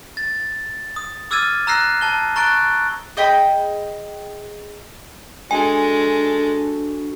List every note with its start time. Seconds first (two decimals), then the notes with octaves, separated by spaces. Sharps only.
0.17 A6
0.96 D#6
1.31 D6 E6 F6 G#6 A6 D#7
1.67 A#5 E6 F#6 A#6 C7
2.01 A5 G7
2.36 A#5 C#6 F#6 A6 D7 G7
3.17 G#4 D#5 G5 B5
5.51 G#3 D4 F#4 A4 G#5